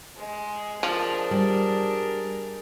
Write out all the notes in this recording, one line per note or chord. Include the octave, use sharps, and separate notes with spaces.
G#3
F3 D4 G#4 A#4
G3